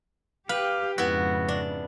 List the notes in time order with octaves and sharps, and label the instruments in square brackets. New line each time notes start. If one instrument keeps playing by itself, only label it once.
[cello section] G4 [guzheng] B4 [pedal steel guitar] F5
[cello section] F2 G#2 C#3 [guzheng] B3 E4 [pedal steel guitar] F#4
[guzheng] D4